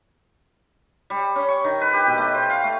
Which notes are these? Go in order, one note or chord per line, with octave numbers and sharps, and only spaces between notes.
G3
C#4
C#6
D#3
B4
G4
B2
A3
C5
F5
A3